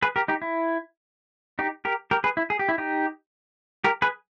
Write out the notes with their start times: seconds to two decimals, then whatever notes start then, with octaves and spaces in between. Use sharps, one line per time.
0.02 G#4 B4
0.16 G4 A#4
0.28 D#4 G4
0.42 E4
1.59 D#4 G4
1.85 G4 A#4
2.11 G4 A#4
2.24 G#4 B4
2.37 E4
2.50 G#4
2.59 G4
2.69 E4
2.78 D#4 G4
3.84 G4 A#4
4.02 G#4 B4